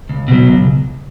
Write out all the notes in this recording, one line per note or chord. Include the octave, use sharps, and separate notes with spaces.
C#2
B2 F#3
C#2